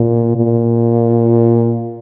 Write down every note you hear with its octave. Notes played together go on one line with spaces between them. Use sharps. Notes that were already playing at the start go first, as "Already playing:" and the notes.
Already playing: A#2
A#2